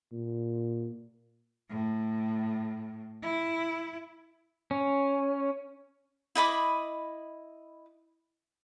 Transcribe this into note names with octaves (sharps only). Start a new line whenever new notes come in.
A#2
A2
E4
C#4
E4 D#5 B5 D6